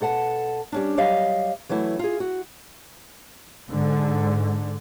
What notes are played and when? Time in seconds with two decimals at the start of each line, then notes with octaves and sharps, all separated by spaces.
0.01 B2 A4 F#5 A5
0.72 G3 C#4 D4
0.97 F#3 G3 D#5 F5
1.69 E3 F#3 A3 E4
1.99 F4 G#4
2.20 F#4
3.70 G#2 D3